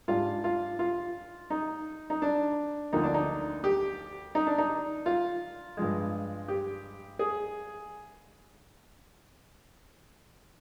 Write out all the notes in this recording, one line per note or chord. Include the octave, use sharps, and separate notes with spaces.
G#2 G3 D4 F4
F4
F4
D#4
D#4
D4
D2 D3 F3 A#3 D#4
D4
D#4
G4
D#4
D4
D#4
F4
G2 F3 G#3
G4
G#4